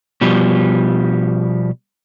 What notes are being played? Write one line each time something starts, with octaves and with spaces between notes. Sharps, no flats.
B2 F3 G3